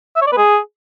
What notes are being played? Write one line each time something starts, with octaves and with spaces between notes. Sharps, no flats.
E5
C#5
D5
B4
G#4